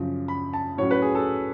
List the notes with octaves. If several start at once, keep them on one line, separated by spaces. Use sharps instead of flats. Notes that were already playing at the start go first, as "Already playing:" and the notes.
Already playing: F#2 C#3 F3
B5
A5
A2 F#3 C#4 C#5
B4
G#4
A4